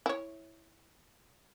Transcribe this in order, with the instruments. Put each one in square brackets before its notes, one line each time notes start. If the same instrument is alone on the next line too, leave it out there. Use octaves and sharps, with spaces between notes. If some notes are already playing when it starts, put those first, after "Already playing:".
[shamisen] E4 C#5